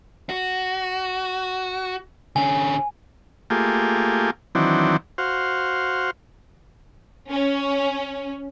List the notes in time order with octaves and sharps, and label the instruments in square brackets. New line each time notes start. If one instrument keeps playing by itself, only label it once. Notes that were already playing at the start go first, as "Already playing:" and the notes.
[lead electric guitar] F#4
[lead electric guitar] D3 C#4 [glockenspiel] G#5
[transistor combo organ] A3 A#3 F4 G4 G#4
D#3 E3 F#3 C4 D4
F#4 C5 F5
[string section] C#4